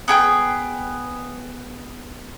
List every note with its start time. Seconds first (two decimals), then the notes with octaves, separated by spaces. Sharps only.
0.08 B3 G#4 G5